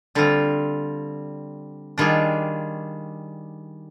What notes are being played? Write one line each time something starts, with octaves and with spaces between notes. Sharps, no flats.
D3 G3 C4 F4
D#3 G3 D4 F4 G#4